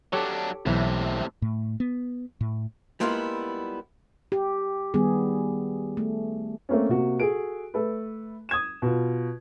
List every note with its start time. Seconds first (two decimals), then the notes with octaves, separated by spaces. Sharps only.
0.13 F#3 D4 G4 A4 C#5
0.66 B1 A2 C3 E3
1.42 A2
1.80 B3
2.41 A2
3.00 G3 G#3 A#3 B3 E4 F4
4.32 G4
4.94 D#3 G3 B3 G#4
5.97 A3
6.69 A3 A#3 C4 C#4
6.89 C3 A#3 F#4
7.20 F#4 G#4 A4 D7
7.74 A3 A4 B4
8.49 D#6 G#6 E7
8.82 B2 F4